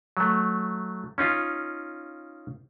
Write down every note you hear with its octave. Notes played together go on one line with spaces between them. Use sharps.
F#3 A3
C#4 D#4 F4